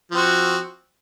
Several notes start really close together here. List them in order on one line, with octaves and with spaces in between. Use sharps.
F3 C4 F#4